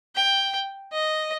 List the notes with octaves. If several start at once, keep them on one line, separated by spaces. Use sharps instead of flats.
G5
D#5